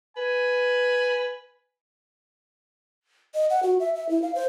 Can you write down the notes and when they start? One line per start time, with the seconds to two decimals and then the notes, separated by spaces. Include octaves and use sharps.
0.17 B4 G#5
3.34 D#5
3.50 F#5
3.63 F#4
3.80 E5
3.95 E5
4.09 E4
4.22 F5
4.35 C5